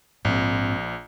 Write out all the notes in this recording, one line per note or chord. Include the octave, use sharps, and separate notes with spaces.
A#1 G#2 C4